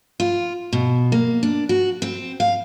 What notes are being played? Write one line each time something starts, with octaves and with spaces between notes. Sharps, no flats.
F4
B2
A#3
D4
F#4
C4
F5